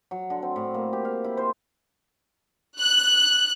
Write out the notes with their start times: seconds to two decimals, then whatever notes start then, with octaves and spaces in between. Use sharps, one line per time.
0.11 F#3
0.30 D3
0.42 C4
0.56 A2
0.74 A#3
0.93 G4
1.05 F5
1.24 E4
1.37 C5
2.79 F#6